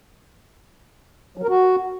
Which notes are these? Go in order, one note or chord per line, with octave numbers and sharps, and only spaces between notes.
F#3
A#4
F#4